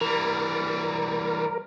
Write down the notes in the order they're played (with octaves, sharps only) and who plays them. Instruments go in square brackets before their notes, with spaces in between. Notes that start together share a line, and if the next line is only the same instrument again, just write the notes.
[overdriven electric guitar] E3 G3 [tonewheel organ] A#4